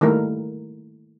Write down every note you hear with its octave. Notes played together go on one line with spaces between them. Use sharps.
D#3 G3 A3 A#3 E4 A#4